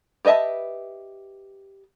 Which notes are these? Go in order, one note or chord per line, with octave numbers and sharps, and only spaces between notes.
G4 B4 D#5 E5 A5